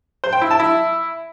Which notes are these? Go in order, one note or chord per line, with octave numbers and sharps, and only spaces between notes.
C5
G5
E4
A5
E4